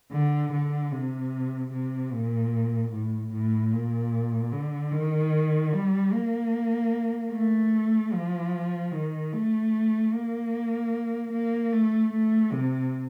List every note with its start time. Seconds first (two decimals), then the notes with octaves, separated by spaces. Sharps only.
0.12 D3
0.52 D3
0.92 C3
1.72 C3
2.12 A#2
2.92 A2
3.33 A2
3.72 A#2
4.52 D3
4.92 D#3
5.73 G3
6.12 A#3
7.32 A3
8.12 F3
8.92 D#3
9.32 A3
10.13 A#3
11.32 A#3
11.73 A3
12.12 A3
12.53 C3